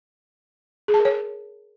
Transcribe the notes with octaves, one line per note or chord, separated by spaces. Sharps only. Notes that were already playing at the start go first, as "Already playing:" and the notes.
G#4
A5
A#4
C#5